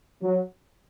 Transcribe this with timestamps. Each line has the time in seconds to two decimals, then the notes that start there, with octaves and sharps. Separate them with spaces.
0.22 F#3